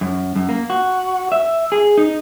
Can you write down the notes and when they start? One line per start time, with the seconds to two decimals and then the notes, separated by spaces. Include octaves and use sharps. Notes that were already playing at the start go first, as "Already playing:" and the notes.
0.01 F#2
0.36 F#2
0.49 A#3
0.70 F#4
1.32 E5
1.72 G#4
1.98 D#4